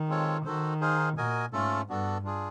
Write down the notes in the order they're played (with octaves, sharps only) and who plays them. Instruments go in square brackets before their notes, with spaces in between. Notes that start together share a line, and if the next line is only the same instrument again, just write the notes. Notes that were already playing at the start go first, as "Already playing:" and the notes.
Already playing: [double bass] D#3
[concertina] G#3 C4 F4 A4 C#5
[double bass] D#3 [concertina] F#4 A4 C5
[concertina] D#4 G#4 C5 F5
[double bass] A#2 [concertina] F#4 A#4 D#5 G#5
[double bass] G#2 [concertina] A3 C#4 F4 A4
[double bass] G2 [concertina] B3 D4 F#4 A4
[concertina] D4 F4 G#4